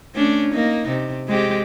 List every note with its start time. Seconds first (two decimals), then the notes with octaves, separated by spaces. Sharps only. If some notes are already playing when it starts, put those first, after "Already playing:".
0.15 A3 C#4 D4
0.53 A#3 D#4
0.89 C3
1.28 G#3 C4 G4